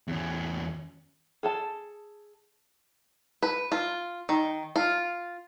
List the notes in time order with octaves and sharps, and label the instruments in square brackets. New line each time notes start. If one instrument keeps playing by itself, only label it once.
[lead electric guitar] E2 C#4
[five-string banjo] G#4 A4 A5
B4
F4
D#3
F4